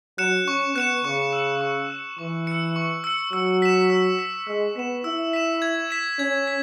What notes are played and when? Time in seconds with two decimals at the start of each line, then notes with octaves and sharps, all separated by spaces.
0.18 F#3 F#6 C#7 E7
0.47 C#4 C#6
0.75 B3 F#6 C#7 E7
1.04 C#3 C#6
1.33 E6 C#7
1.61 C#6
1.90 E6 C#7
2.18 E3 C#6
2.47 E6 C#7
2.76 C#6
3.04 E6 C#7
3.33 F#3 E6
3.62 B6 E7
3.90 E6
4.19 B6 E7
4.47 G#3 E6
4.76 B3 B6 E7
5.04 E4 E6
5.33 B6 E7
5.62 G#6
5.91 B6 E7
6.19 C#4 G#6
6.47 B6